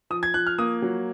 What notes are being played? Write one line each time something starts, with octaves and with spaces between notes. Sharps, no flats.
F3 D#6
G#6
F3 F#6
F6
A#3 D#6
F#3